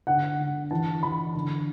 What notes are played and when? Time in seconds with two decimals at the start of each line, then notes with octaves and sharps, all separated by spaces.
0.07 D3 F#5
0.39 D3
0.71 E3 A5
1.03 E3 B5
1.35 D3